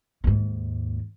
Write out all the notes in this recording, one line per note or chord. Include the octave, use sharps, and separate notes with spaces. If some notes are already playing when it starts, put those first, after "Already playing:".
D#2 G#2